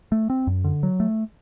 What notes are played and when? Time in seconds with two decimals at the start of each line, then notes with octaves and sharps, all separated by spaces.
0.12 A3
0.30 C4
0.47 F#2
0.64 D3
0.83 F#3
1.00 A3